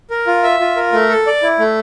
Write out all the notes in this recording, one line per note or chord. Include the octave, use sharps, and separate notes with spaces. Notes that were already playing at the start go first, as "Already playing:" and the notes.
A#4
F4
E5
F4
A#4
A3
A4
D5
E4
A3